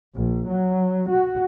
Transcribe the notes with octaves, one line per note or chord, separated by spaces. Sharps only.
A#1
F#3
F#4